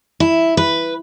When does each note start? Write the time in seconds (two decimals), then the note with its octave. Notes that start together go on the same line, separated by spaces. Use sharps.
0.20 E4
0.57 B4